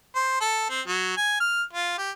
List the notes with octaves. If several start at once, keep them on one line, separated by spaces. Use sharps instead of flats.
C5
A4
C4
F#3
G#5
F6
F4
G4